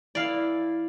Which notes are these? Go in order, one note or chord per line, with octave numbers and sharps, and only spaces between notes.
E3 E4 D5 F5